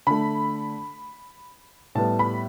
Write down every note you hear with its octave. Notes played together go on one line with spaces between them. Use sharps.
D3 A3 B5
A2 G3 B3 A5
B5